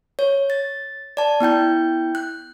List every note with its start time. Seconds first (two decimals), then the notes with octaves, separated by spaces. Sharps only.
0.19 C#5
0.50 A6
1.17 D5 A5
1.40 B3 E4 G5 G6
2.15 F#6